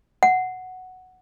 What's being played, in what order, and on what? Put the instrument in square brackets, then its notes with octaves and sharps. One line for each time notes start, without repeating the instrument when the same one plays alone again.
[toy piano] F#5